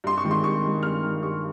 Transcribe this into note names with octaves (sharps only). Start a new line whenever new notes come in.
G2 C6
C#6
D#3 G#3
C6
G2 C#6
D#3 G#3
G2 F6
D#3 G#3
G2 C#6